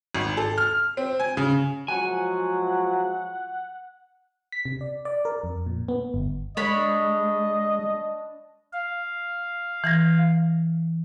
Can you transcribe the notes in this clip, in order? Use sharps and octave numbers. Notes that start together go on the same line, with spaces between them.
G#1
A4
F6
C4
G#5
C#3
F3 F#3 G#3 F#5 G#5
B6
C3
D5
D5
A#4
F2
A#2
B3
G1
G#3 D4 C#5 D#5 B5
F5
E3 G#6 A#6